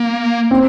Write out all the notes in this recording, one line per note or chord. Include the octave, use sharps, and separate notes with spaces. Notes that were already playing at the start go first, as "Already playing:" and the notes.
Already playing: A#3
C4